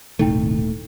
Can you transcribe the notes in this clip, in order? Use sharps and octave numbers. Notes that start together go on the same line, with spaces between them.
D#1 G#1 C3 D#3 A3 D#4 E4 G5